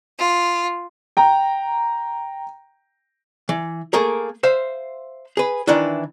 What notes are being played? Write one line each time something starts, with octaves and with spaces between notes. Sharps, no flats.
F4
G5 A#5
E3
A3 A#3 G#4 A#4
C5 E5 F5
G#4 B4
D#3 E3 D4 E4